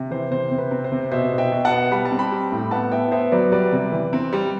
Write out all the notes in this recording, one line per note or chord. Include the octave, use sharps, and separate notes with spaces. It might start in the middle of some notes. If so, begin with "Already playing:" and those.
Already playing: C3
E3 C5
C3 C5
C3
B4
C4
C5
C3
B2 C5 E5
B2
E5 G5
B2
F#5 A5
B3
G3 B5
A5
C4
G5 B5
G3
A2
B3 F#5 A5
B3 E5 G5
B3 C5 E5
F#3 B4 D5
G3 B4 D5
C3
E3
C4
G3